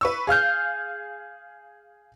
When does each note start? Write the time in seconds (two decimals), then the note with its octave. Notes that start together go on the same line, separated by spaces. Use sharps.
0.01 B4 C#6 E6
0.27 G#4 F5 F6 G6